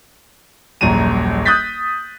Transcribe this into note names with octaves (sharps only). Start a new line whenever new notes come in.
D#1 A#1 F#2 A#5 D#7
D#6 F#6 G6 A6 B6